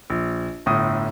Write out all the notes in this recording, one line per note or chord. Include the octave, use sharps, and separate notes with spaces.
A#1
G1 A2 D#6